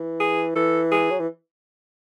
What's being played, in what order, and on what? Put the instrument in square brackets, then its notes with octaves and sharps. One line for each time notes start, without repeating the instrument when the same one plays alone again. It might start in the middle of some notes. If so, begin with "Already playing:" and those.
Already playing: [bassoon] E3
[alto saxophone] G#4
[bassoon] E3 [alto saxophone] A4
[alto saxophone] G#4
[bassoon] F#3
E3